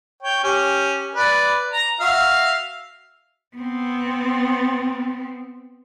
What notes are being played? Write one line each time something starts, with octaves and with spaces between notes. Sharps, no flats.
C#5 G5
C#4 G4
B4 D5
A#5
F#4 E5 F5
B3 C4